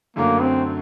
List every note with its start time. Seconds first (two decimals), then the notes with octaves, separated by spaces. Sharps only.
0.16 F#2 D3 F#3 A3 A#3
0.42 C4